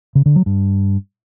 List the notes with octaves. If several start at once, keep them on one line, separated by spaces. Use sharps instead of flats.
C#3
D3
F#3
G2